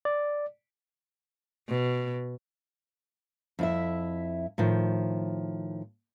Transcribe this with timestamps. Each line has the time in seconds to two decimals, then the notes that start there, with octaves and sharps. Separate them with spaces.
0.05 D5
1.68 B2
3.59 F2 E4 E5
4.58 A2 D#3 F3